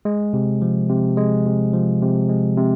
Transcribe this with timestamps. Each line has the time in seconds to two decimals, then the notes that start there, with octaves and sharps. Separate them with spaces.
0.05 G#3
0.33 C3
0.62 F3
0.89 C3
1.17 G#3
1.46 C3
1.73 F3
2.02 C3
2.29 G#3
2.57 C3